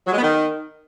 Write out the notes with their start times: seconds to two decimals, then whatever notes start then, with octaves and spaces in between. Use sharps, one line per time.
0.07 F#3
0.12 G#3
0.17 B3
0.23 D#3